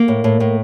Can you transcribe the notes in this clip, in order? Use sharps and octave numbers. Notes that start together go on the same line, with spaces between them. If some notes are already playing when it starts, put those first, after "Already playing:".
Already playing: A#3
A2
A2
A2